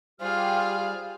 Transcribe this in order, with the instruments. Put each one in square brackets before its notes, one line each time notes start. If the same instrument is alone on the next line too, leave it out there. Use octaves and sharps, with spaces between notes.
[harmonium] G3 C5 [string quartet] F4 [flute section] G4 F6 [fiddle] G#4 F5